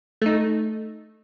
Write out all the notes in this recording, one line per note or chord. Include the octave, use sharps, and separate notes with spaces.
A3 D#4